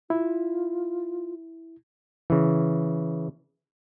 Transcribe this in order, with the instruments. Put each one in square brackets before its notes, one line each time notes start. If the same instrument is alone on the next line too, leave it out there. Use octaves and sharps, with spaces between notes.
[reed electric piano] E4 [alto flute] F4
[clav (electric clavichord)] C#3 E3